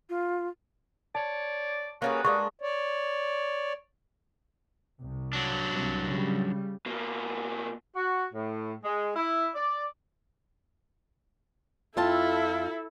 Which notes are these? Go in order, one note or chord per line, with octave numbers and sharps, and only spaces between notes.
F4
C#5 D5 A5
G3 A#3 C#4 F#4 G#4 B4
G#3 A#3 D4 C#6
C#5 D5
C2
F#3 D4
C2
C#3 G3
B2 A#3
F#4
A2
G#3
E4
D5
F2 E4 F4 A4 A5